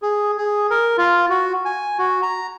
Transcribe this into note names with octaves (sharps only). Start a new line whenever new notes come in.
G#4
G#4
A#4
F4
F#4
G#5
F#4
A#5